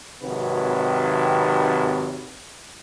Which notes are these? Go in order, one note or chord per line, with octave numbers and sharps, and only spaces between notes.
G#1 C3 D#3 F#3 B4